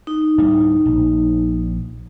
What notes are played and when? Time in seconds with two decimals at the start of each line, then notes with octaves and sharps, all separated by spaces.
0.07 D#4
0.38 D2 A2 G3
0.86 A#1